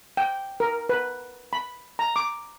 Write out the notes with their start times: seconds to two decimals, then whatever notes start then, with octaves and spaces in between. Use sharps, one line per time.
0.17 G5
0.60 A#4
0.89 B4
1.53 B5
1.99 A#5
2.16 D6